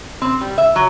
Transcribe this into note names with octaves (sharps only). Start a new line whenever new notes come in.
C4
G3
E5
F#3